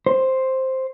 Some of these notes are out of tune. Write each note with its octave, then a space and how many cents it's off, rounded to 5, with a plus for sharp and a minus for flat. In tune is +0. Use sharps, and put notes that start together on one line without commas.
C5 +5